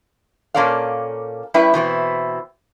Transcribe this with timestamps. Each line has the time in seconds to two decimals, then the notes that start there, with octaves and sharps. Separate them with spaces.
0.54 A#2 A#3 C#4 A4 D5 F5
1.54 G3 C#4 E4 B4 E5 G5
1.74 B2 E3 C4 E4